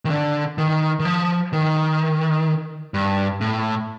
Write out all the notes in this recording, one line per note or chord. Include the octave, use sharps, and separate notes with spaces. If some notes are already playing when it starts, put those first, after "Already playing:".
D#3
D3
D#3
D#3
F3
D#3
G2
A2